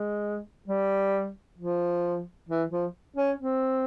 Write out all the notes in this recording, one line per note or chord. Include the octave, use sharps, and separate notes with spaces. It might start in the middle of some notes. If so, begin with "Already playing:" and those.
Already playing: G#3
G3
F3
E3
F3
C#4
C4